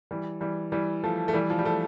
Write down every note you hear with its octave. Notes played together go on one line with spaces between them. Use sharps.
E3 G3
E3 G3
E3 G3
F3 A3
A3
E3 G3
F3
G3
F3 A3